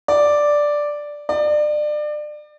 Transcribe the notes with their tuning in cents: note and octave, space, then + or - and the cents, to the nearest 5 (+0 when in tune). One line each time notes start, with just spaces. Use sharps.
D5 +0
D5 +30